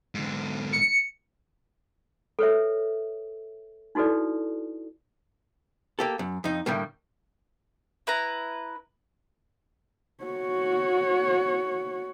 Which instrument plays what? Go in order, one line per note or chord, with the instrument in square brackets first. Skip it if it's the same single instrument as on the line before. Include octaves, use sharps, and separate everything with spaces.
[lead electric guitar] G#2 D3
[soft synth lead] C#7
[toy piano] A4 B4 C#5 E5
D#4 E4 F#4 A4 B4 D5
[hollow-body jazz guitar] A#3 G4 A4
F#2
F2 D#4
A2 D3 G3 A#3
[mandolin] E4 B4 A#5
[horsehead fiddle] F#4 C#5